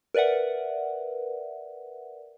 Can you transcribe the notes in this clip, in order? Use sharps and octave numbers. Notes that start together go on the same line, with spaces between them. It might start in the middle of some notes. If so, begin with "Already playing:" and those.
A#4 B4 D5 E5 F#5